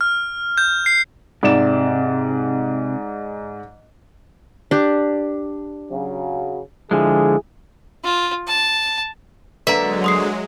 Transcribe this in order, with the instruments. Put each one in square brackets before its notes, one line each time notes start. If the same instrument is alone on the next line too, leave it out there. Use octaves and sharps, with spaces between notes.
[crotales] F6
G6
C7
[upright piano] G#2 D5 E7 [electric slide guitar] C3
[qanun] D4 G4
[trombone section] C#3 F#3
[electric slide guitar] D3 F3 G#3 [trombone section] E4 G#4
[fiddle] F4
A5
[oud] D3 A#3 [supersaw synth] F#3 G#3 [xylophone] B4 A#5 [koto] E5
[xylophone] C6 D#6 C7